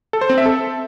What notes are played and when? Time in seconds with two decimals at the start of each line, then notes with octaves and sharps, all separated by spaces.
0.13 A4
0.21 C5
0.30 C4
0.38 E5
0.46 A4